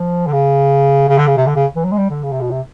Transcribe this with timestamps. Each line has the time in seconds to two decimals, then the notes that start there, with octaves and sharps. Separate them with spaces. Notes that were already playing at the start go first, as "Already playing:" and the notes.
Already playing: F3
0.27 D3
0.33 C#3
1.09 C#3
1.18 D3
1.27 C#3
1.37 C3
1.47 D3
1.56 C#3
1.76 E3
1.85 F#3
1.91 G#3
1.98 G3
2.10 D3
2.23 C#3
2.32 C3
2.41 B2
2.51 C3